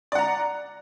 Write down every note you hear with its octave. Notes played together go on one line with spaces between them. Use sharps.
D5 F#5 A#5